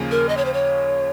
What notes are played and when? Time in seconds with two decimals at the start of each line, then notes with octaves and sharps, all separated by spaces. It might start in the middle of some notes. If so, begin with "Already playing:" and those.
Already playing: D#2 C#3 F3 A#3 C#4
0.11 A#4
0.29 D#5
0.37 C#5
0.45 C5
0.54 C#5